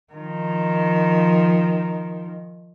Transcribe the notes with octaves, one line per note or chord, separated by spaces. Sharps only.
D#3 F3